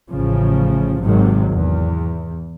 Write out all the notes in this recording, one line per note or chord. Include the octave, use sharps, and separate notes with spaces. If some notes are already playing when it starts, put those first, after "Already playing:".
A1 C#3 F3
G#1 G#2 C3 D#3 F#3
E2